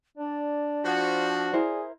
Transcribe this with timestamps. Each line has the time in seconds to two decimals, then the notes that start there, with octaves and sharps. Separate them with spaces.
0.17 D4 D5
0.84 F3 F#4
1.53 E4 G#4 A#4 C5